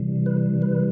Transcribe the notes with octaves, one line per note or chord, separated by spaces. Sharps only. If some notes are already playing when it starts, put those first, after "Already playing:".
Already playing: C3 E3 G3
B4
B4